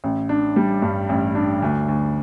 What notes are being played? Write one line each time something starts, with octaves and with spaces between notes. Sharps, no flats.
A1
D4
G3
G2
A1
D4
D2
D2